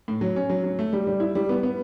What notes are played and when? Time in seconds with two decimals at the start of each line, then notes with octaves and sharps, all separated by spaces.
0.08 A2
0.21 F#3
0.36 C#4
0.50 F#3
0.64 F#3
0.79 A3
0.93 G3
1.07 G3
1.20 E4
1.35 G3
1.49 B3
1.63 B3